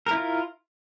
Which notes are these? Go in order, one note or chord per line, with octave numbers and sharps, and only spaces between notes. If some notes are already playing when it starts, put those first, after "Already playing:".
E4 F4 A#4